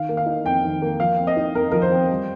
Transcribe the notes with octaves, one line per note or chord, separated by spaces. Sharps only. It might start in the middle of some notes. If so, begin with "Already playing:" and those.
Already playing: D#3 F5
A#3
F5
D#4
F2 G5
D#3
A#3
F3 F5
C4
D#5
D#4
F2 A#4
F3 A#4
C5
C4
G3